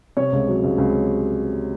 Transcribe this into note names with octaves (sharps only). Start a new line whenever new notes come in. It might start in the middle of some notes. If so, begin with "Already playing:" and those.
C3 C#5
C#2
F#3
C#2
C#2